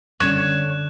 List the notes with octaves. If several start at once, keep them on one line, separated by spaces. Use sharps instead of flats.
F#1 D3 G3 C#4 C#5 F#6 E7